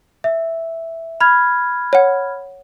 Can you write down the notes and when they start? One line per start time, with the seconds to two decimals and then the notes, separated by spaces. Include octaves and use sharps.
0.24 E5
1.21 B5 F6 G#6
1.93 C#5 F#5